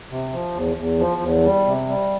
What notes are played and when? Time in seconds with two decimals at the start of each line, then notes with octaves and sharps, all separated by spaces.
0.10 C3
0.33 F3
0.55 E2
0.77 E2
0.99 F3
1.22 E2
1.44 G3
1.67 C3
1.89 G3